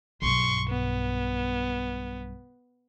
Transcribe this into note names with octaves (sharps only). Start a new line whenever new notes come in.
B1 G2 C6 C#6
B3